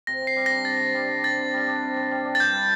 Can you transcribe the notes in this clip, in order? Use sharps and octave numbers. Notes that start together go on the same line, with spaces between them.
C3 A#6
C3
C7
G3
D4 A#6
C3 A6
C3
G3
D4
C3 A6
C3
G3
D4
C3
C3
G3
D4
A6
G2 G6
E4